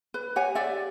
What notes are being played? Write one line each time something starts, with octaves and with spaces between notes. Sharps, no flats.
B4
G4 C#5 F#5 G#5
G4 D5 E5